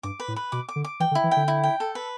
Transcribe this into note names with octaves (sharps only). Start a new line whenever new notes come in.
G2 D6
B4
A2
B4
B2 D6
D6
D3
D6
E3 G5
D3
E4
E3
G5
D3
E4
G5
A4
B4